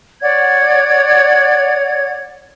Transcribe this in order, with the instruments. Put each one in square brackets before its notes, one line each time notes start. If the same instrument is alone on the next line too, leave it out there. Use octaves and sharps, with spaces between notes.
[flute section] C#5 D5 F#5 G#6